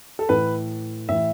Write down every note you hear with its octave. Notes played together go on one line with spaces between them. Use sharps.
A4
A2 E3 B4
A2 E3 E5